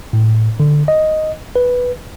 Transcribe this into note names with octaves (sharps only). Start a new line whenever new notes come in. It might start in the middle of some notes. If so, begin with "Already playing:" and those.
A2
D3
D#5
B4